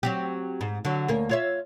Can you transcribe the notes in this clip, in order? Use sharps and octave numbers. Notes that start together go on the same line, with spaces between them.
F#3 C4 G4
G#2
D3 F#3
D2 A#3 C#4
F4 C#5 E5